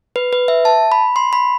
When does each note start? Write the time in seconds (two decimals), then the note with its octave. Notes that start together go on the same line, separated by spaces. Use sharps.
0.16 B4
0.33 B4
0.48 E5
0.65 A5
0.92 B5
1.16 C6
1.33 B5